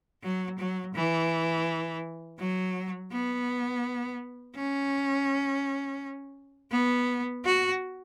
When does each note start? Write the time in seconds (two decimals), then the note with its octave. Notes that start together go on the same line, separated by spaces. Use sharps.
0.23 F#3
0.59 F#3
0.94 E3
2.39 F#3
3.12 B3
4.56 C#4
6.71 B3
7.44 F#4